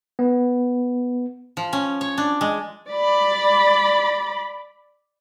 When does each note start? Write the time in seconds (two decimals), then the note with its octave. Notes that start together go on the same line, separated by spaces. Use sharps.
0.19 B3
1.57 F3
1.73 C#4
2.01 C#5
2.18 D4
2.41 G#3
2.89 D5 B5